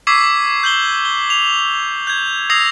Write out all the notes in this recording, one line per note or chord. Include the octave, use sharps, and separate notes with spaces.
C#6 D6 E6 G#6 B6 C7
G6 F#7 G7
G7
F7
G6 G#6
D#6 E6 G#6 A#6 C7 F7